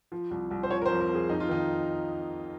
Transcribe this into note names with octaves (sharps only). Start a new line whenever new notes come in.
F3
C2
C2
C5
F3 C#5
A#4
C5
F2
A#4
F2 G#4
F2 D#4
F4
D#3 D#4